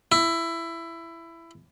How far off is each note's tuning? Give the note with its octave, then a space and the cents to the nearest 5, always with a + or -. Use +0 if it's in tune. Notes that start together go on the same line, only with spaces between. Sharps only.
E4 +15